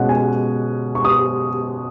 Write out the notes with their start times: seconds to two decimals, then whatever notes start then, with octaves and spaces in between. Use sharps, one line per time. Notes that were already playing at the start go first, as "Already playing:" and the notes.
Already playing: B2 G#3 C#4 F#5
0.09 G#5
0.95 C#6
1.05 D#6